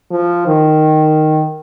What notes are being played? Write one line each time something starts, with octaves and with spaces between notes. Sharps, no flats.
F3
D#3